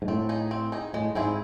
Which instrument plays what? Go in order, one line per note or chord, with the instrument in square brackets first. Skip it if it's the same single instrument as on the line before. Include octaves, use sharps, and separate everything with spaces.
[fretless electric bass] G#2
[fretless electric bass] A2 [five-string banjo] C4
[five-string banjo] D#4 G#4
C4
D#4 G#4
[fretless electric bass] A2 [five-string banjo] G#3
[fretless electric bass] G#2 [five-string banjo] C4 E4 G#4